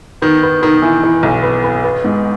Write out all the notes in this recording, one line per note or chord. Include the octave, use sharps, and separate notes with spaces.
D#3 B3
B3
D#3 B3
E3
E3
B1
B3
B3
B3
G#2